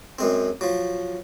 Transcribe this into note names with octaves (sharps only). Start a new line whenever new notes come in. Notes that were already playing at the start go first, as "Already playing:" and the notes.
F#2 G#3 C4
F3 F#3